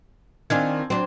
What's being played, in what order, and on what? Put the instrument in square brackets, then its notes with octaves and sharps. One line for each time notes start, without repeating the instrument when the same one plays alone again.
[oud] D#3 D4 F4 [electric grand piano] C4 G#5 G#6
[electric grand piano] F#3 [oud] C4 D4